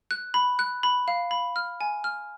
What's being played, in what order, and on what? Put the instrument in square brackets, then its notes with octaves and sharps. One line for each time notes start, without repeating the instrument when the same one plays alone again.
[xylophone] F#6
B5
F#6
B5
F5
B5
F6
G#5
F6